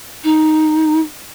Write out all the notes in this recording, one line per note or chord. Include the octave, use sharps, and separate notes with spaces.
D#4